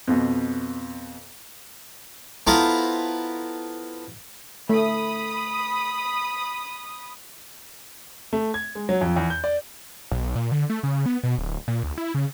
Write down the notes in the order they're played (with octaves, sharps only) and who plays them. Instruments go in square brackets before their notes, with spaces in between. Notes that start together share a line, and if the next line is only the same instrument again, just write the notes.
[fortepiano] F2 B2
[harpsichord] B3 E4 F4 A4 C5 A#5
[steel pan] A3 [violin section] B5 D#6
[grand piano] A3
G#6
G#3
F#3
F2
E2
G6
D5
[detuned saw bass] B1
A#2
D3
A3
C#3
B3
B2
D1
A#2
D2
E4
C#3